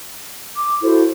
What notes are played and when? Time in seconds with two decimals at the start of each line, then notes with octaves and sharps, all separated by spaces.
0.55 D6
0.82 E4 F#4 A4 C5